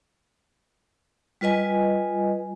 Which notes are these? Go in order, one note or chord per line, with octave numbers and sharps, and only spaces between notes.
G3 F4 B4 D#5 G#5